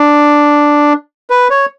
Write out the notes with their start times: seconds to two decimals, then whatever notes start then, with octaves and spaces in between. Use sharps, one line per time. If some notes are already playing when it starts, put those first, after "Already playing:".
Already playing: D4
1.30 B4
1.50 C#5